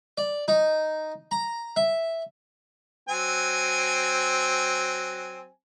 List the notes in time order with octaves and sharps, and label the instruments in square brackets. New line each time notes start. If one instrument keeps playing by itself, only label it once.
[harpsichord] D5
D#4
A#5
E5
[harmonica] F#3 C4 G#5